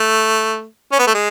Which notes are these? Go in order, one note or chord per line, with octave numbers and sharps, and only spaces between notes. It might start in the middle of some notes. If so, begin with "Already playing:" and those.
Already playing: A3
C#4
B3
A3
G#3